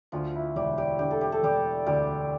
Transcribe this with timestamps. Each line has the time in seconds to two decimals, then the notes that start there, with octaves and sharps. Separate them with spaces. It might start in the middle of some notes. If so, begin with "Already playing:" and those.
0.12 D2 F3 F4
0.34 E4
0.56 E1 G3 G4
0.77 G3 G4
0.99 D3 G4
1.11 A4
1.21 G4
1.32 A4
1.43 E1 G3 G4
1.86 D2 G3 G4